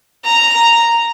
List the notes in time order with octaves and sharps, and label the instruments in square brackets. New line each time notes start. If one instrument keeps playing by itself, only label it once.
[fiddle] A#5